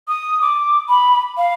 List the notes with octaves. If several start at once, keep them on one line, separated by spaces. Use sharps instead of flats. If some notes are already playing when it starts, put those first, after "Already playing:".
D#6
D6
B5
F5